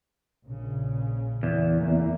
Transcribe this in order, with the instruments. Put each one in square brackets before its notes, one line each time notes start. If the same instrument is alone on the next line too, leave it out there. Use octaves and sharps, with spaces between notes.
[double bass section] A#1 C#3
[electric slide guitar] E2
[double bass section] E3 A#3